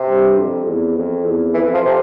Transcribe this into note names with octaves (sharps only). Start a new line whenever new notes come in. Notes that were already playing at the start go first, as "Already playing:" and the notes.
Already playing: C3
G2
F2
E2
F2
E2
F2 E3
F3
C3